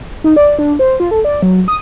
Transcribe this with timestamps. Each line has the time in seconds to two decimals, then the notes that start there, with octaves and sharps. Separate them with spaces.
0.24 D#4
0.36 D5
0.59 D4
0.79 C5
1.00 F4
1.11 A4
1.25 D5
1.42 F#3
1.68 D#6